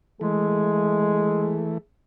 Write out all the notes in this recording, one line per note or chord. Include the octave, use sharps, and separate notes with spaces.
E3 G#3 A3 G#4